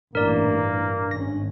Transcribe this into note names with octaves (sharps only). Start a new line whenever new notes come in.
A1 G2 A#2 E3 A#3 A#4 D5
G#1 C#4 A#6